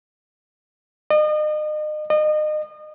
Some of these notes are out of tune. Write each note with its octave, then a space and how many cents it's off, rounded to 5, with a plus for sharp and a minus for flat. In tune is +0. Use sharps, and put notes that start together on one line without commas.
D#5 -35
D#5 -30